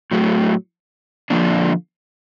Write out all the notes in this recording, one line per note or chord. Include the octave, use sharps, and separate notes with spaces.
A2 F#3 A3
D3 F3 A#3 D4